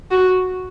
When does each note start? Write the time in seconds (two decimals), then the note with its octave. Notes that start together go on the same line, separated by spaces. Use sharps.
0.11 F#4